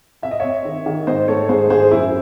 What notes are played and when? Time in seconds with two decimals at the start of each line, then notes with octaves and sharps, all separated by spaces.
0.22 C4 E5
0.31 D#5
0.40 C4 C#5 E5
0.65 D#3
0.86 D#3
1.07 G#2 C5 D#5
1.27 A3 A4 C#5
1.49 G#2 G#4 C5
1.70 D#3 G#4 C5
1.91 F#2 E4 G#4